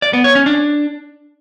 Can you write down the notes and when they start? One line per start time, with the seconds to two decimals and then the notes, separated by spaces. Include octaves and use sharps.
0.02 D5
0.13 B3
0.24 C#5
0.35 C#4
0.46 D4